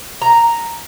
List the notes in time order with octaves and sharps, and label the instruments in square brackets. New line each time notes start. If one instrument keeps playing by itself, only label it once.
[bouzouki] A#5